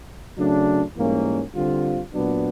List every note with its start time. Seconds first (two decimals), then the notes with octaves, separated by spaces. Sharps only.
0.37 C#3 F#3 A3 D4
0.95 G#2 E3 G3 A#3 C#4
1.55 D3 G3 C4 F4
2.14 A#2 F#3 B3 D4